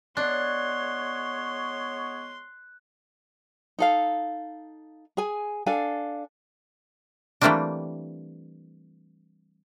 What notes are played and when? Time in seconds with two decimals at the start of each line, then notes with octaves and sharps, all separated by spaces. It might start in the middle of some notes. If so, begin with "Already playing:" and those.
0.17 G#3 B3 D4 C#5 C6 F#6
3.79 D#4 A4 F5
5.17 G#4 G#5
5.66 D4 A4 F5 G#5
7.41 E3 G3 A3 A#3 C4 D4